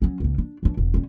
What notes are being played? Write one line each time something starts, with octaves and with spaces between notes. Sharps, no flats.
F#3 C#4
C#2 G#2
D4
E3 D4
E1
G3 C#4